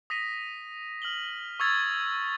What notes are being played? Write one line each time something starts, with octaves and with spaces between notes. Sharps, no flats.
D#6 A#6 B6 D#7
F6 F#7 G7
C#6 D#6 E6 G#6 A6